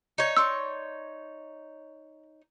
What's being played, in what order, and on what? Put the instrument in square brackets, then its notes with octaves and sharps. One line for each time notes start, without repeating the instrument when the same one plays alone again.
[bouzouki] D#4 C#5
[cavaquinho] D5 C6 C#6 [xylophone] E6